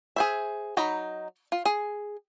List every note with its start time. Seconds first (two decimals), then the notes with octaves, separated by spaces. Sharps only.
0.16 G#4 C5 E5
0.77 F#3 D#4 A#5 B5
1.52 F4
1.65 G#4